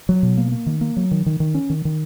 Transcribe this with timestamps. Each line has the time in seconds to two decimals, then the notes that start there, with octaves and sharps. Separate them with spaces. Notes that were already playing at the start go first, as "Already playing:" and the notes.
0.09 F#3
0.23 B2
0.37 A#3
0.52 A#3
0.66 D#3
0.81 A#3
0.97 F#3
1.11 D#3
1.26 D#3
1.40 D#3
1.55 C#4
1.70 D#3
1.85 D#3